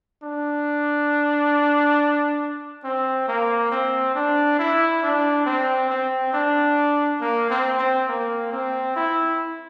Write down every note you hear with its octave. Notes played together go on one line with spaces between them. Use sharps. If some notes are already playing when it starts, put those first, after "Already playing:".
D4
C4
A#3
C4
D4
E4
D4
C4
C4
D4
A#3
C4
C4
A#3
C4
E4